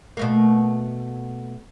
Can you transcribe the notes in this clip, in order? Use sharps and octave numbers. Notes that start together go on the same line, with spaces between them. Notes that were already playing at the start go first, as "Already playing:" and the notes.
B2 A3 A#3